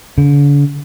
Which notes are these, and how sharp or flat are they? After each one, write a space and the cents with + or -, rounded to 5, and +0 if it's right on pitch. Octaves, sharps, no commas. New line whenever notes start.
D3 -45